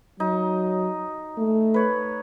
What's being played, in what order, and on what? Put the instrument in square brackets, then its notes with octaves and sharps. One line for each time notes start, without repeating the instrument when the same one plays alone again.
[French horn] F#3 [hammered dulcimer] D#4
[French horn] A3
[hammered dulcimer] B4 C#5